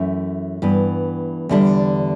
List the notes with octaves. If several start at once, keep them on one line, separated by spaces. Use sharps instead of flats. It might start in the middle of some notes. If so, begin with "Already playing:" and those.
Already playing: F#2 E3 A3
G2 E3 B3
E2 D3 G3 D4